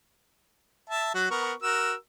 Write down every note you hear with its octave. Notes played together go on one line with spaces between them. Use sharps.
E5 A5
F#3 F#4
B3 A#4 C#6
F#4 A#4 E6